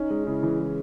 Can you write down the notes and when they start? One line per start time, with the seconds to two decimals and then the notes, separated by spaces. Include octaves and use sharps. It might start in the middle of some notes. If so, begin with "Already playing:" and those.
Already playing: C#4 D#4
0.10 G#3
0.27 C#3 E4
0.43 E3
0.60 G#3